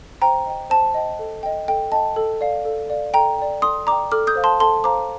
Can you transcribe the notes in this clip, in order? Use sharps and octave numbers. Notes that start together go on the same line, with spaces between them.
C5 G5 A#5
D#5 G5
C5 A5
D#5 G5
A4
D#5 G5
A4 G5
D#5 G5 A5
A4
D5 F5
A4
D5 F5
A4 G5 A#5
D5 G5
A4 C6 D#6
D5 G5 A#5 D6
A4 D6 F6
D#6 G6
C5 F5
A5 C6
A4 A5 C6
C5 F5 A#5 D6